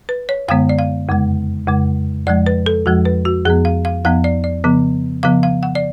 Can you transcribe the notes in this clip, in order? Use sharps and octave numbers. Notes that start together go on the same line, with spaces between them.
B4
C#5
F#2 D3 G#3 B3 F5
D5
F5
F2 C#3 G#3
F2 C#3 G#3
F2 F3 G#3 D5
B4
A4
F2 F3 G#3 F#4
B4
F#4
F2 F3 B3 G#4
F5
F5
F2 F3 B3 F5
D5
D5
C#3 F3 B3
C#3 F3 B3 F5
F5
F#5
D5